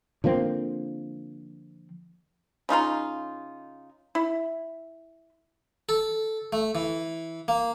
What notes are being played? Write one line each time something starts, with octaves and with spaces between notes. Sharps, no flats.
D3 F3 A#3 C4
C#3 D#4 F4 A#5
E4
A4
A3
E3
A#3